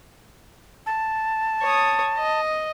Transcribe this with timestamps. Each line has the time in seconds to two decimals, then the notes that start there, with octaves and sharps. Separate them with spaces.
0.86 A5
1.62 C#5 D#6
2.18 D#5